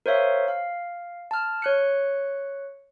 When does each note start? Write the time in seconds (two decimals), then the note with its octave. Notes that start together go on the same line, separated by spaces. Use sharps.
0.06 A#4 C5 C#5 E5 F5
0.48 F5
1.31 A5 F6
1.62 C#5 F#6 C#7